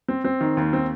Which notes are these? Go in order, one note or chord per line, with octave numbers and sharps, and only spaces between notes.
C4
C4
D#3
D#2
C4